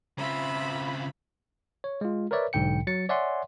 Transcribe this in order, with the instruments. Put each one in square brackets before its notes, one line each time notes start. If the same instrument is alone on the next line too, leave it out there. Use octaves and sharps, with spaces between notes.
[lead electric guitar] C#3 C4 [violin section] F4 B5 [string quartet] E5
[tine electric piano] C#5
G#3 F4
A#4 B4 C#5 D5 E5
B1 G#2 D3 G5 C#7
F#3 A6 C#7
C#5 D5 E5 F#5 G#5 C6